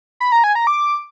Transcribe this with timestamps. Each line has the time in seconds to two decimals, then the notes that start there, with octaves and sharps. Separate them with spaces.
0.20 B5
0.32 A#5
0.44 G#5
0.55 A#5
0.67 D6